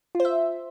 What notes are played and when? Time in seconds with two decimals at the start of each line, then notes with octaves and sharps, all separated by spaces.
0.15 F4
0.20 C5
0.25 E5